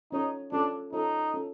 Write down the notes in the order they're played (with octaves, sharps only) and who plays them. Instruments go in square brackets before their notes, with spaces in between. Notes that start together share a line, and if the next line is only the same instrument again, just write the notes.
[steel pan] C#4 F4 A4 C#5 [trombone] D#4
[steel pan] C#4 F4 A4 C#5 [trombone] D4
[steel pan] C#4 F4 A4 C#5 [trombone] D#4
[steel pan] C#4 F4 A4 C#5